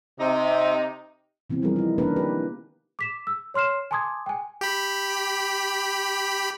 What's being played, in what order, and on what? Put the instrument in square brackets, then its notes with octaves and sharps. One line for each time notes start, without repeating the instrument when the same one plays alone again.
[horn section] C3 D#4
[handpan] C3 E3 B3 C4
F3 G3 B3 G#4 A#4
D#4 E4
D#3 A#3 C#4 D4 A#4 B4
G4 B4
[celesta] D6 B6 E7
E6
C#5 C6 F6 C7 E7
G#5 A5 C6 D6 D#6 G#6
G5 G#5
[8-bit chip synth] G4 B5